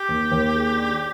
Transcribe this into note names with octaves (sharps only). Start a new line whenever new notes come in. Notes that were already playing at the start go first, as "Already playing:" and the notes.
Already playing: G4
D#2
D#2
G#4
D4